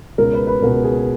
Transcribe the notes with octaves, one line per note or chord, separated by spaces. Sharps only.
C#2 B2 A#4
B4
B4
C#2 B2 A#4
G#4